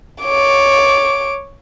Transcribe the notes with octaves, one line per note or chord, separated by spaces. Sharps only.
C#5 D6